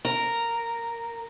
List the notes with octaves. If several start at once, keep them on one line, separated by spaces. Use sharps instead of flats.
A#4